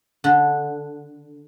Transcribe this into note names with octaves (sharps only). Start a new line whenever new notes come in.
D3